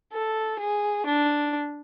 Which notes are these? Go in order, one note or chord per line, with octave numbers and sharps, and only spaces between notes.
A4
G#4
D4